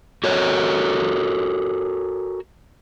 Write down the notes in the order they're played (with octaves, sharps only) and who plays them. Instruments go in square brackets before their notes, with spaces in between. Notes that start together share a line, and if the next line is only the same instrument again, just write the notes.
[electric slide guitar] F#4 A4 A#4 C#5